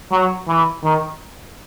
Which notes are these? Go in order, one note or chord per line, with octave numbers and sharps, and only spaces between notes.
F#3
E3
D#3